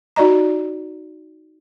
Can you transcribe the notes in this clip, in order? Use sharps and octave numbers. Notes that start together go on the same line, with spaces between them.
D#4 F#4 D5 D#5 A#5